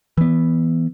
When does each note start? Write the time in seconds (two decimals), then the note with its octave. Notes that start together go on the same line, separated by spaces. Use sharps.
0.18 E3 B3